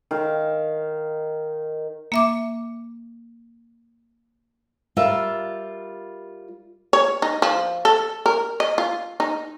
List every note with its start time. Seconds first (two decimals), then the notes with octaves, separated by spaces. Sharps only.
0.11 D#3 F5
2.12 A#3 E5 D6
4.97 G3 F4 A#4 D5 E5
6.93 C#5
7.22 D#4
7.42 F3
7.85 A4
8.26 A#4
8.60 D#5
8.78 F4
9.20 D#4